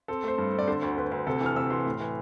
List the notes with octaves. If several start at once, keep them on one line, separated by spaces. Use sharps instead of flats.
C4 A4
A3 C5
G2
C4
D5
D3 C5
D2
D2 B4
D2
C3 A4
E3
F6
C3 E6
E3 C6
A2
E3